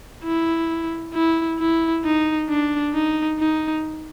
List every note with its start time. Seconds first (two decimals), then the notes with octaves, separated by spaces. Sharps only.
0.24 E4
1.14 E4
1.59 E4
2.04 D#4
2.49 D4
2.93 D#4
3.39 D#4